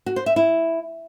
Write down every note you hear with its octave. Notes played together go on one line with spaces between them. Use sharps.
F#4
C5
E5
E4